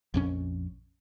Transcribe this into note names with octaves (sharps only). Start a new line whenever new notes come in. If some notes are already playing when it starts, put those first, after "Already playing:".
A#1 F2 C#4